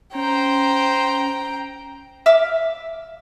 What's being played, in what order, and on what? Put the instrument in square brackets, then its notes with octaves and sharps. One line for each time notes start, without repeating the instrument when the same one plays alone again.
[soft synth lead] C#4 [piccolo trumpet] C5 [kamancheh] G5 A#5
[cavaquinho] E5 F5 D6